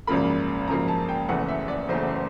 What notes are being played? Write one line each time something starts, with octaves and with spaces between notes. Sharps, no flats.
G#1 F#2 C#3 F3 A#3 B5
G#1 F#2 C#3 F3 A#3 A#5
A5
G5
F#1 E2 C#3 E3 A3 F#5
E5
D5
F#1 E2 C#3 E3 A3 C5